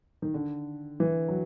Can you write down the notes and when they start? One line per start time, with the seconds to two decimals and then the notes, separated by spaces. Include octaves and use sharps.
0.22 D#3
0.34 D3
1.00 E3
1.28 F#3